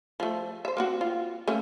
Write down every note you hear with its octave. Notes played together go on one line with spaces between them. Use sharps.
F3 A3
C5 E5
A#3 C4 F#4
F4
A3 A#3 C#4